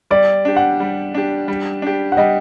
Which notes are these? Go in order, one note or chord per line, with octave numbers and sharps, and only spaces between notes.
G3 D5
D4 G4
F#5
G3
D4 G4
G3
D4 G4
F#5
G3 D#5